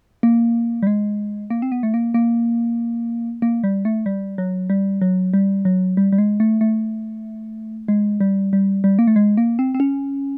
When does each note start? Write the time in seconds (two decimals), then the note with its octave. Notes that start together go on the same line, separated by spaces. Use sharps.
0.23 A#3
0.83 G3
0.87 G#3
1.50 A#3
1.62 C4
1.72 B3
1.83 A3
1.94 A#3
2.14 A#3
3.42 A#3
3.64 G3
3.85 A3
4.06 G3
4.38 F#3
4.70 G3
5.01 F#3
5.33 G3
5.65 F#3
5.97 G3
6.12 G3
6.18 G#3
6.40 A3
6.61 A3
7.88 G#3
8.20 G3
8.53 G3
8.84 G3
8.99 A#3
9.07 A3
9.16 G#3
9.37 A#3
9.59 C4
9.75 C4
9.80 C#4